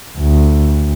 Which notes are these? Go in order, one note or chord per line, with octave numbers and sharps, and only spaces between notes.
D2